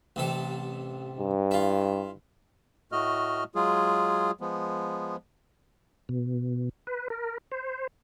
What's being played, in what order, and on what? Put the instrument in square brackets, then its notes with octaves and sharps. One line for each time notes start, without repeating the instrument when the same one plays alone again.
[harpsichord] A1 C3 A4
[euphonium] G2
[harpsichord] E4 F4
[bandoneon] A2 A3 F#4 D#5 F6
F#3 G#3 F4 G#4
F3 G#3 B3
[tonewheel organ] B2
B4
A#4
C5